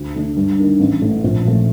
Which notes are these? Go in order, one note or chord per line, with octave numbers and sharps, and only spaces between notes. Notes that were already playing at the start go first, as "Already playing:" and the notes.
Already playing: D2
D3 A3 D4
G2
D#3 A#3 D4
A1
A2 A3
A#1
A#2 F3 A3